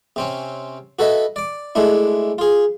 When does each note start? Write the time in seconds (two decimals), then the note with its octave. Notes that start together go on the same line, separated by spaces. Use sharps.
0.16 C3 C4 C#4
0.99 F#4 A4 B4 D#5 E5
1.36 D5 D6
1.75 G#3 A3 D4 E4
2.38 F4 G#4